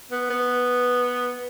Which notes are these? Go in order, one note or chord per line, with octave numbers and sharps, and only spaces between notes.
B3
B3